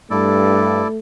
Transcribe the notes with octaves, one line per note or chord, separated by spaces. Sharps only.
G2 A3 E4 A4 D5